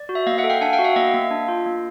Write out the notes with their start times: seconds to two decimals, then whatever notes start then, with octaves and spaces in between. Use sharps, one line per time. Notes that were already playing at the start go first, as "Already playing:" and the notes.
Already playing: D5
0.09 F#4
0.15 E5
0.26 A#3 D#5 F5
0.38 E5 F#5
0.44 A4
0.50 F5 G5
0.61 D4 F#5 G#5
0.73 F5 G5
0.79 F#4
0.84 E5 F#5
0.96 A#3 D#5 F5
1.14 A#3
1.31 D4
1.48 F4
1.66 A#3